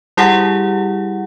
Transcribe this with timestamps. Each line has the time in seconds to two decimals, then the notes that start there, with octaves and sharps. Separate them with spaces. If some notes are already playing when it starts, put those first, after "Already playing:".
0.17 G3 E4 G4 G#4 F#5